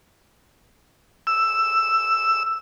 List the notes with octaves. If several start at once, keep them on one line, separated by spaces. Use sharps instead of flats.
E6